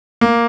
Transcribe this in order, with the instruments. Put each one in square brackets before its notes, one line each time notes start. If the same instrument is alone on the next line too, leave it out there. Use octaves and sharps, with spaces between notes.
[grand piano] A#3